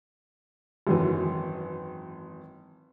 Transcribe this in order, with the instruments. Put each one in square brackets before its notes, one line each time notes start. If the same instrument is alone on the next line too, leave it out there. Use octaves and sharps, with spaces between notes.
[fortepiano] G#1 F#2 E3